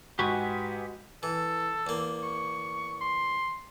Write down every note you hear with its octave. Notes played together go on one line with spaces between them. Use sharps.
G#2 F#4 G4 B4 G#5
E3 A4
E2 A#3
C#6
C6